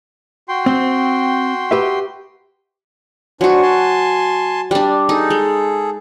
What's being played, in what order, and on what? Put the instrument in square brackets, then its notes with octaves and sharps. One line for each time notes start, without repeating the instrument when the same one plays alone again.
[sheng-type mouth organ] F#4 G5 C6
[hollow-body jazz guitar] C4
G4 B4 E5
[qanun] F#3 F#4 [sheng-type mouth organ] D4 C5 G#5
[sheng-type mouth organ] G#5 A5 C6
[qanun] G3 D4 [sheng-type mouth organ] D5
[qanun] D#4 [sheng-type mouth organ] G#4 A4
[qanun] G#3